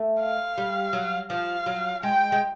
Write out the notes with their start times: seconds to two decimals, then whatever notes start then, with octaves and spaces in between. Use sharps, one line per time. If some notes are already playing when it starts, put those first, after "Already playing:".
Already playing: A3
0.20 F5
0.58 G3
0.93 F#3
1.30 F3 F5
1.66 F#3
2.03 G#3 G5
2.32 G#3